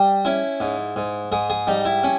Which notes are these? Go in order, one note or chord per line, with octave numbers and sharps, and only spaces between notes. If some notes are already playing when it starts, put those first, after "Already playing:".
Already playing: G3
C#4 E4
G#2
G#2
G#2 G#4
G#4
G3 D#4
E4
C#4